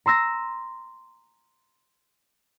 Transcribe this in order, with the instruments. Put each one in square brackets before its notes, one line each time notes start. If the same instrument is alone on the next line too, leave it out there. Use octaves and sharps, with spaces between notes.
[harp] A#5 C6 E6 A#6